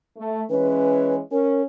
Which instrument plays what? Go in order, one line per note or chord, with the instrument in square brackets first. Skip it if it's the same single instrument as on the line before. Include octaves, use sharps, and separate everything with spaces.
[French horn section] A3
[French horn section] E3 G#3 C#4 [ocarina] B4
[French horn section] C#4 [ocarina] A#4